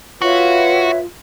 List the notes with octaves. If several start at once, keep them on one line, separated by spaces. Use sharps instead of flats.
F4 F#4 B4 C#5 E5